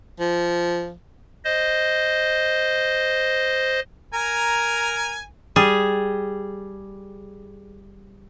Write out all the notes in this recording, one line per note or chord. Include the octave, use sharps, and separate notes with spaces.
F3
C5 D#5
A#4 G#5 A#5
G3 G#4